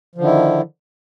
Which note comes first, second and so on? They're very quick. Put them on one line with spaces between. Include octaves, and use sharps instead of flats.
F3 D3 D#3 E4